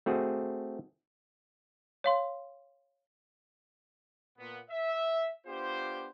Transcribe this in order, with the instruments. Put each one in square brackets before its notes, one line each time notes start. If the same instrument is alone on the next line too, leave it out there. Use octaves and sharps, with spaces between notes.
[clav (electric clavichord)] A3 C4 F#4 G#4
[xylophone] C#5 F5 C6
[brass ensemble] A#2 B3
E5
B3 D4 F4 G4 C5